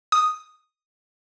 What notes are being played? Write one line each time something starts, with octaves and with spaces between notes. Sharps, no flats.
D#6